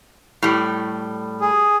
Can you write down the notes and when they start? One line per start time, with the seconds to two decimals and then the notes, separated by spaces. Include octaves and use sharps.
0.42 A2 G3
1.41 G#4